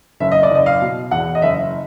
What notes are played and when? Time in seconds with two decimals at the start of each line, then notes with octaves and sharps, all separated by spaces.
0.20 F#1 E5
0.32 D#5
0.43 D5
0.50 F#1 D#5
0.66 F5
0.81 B2
1.11 E2 F#5
1.35 D#5
1.42 F#1 E5